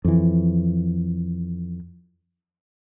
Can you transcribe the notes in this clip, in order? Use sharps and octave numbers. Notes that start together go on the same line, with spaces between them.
F2 E3